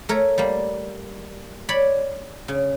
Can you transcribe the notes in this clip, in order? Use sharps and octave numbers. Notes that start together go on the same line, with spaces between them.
A3 A#4 C#5
G3 A#3
C#5 D5 B5
C#3